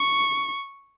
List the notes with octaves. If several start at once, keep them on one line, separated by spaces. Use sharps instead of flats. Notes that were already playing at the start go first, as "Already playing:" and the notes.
Already playing: C#6